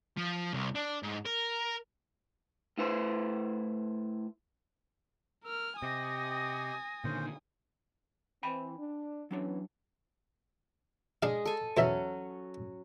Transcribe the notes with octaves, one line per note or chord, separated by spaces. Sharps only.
F3
C2
D4
G#2
A#4
A2 E4 B4 C5
A#4 E6 F6
C3 G4 D#5 G#5 D#6 A#6
A#2 D3 D#3 C#4 C5
E3 C4 G5 G#5 B5
D4
E3 F#3 B3 C#4 D4 C#5
G#3 D4 G#4 F5
A4 G#5
E2 E3 F#3 C#4 E5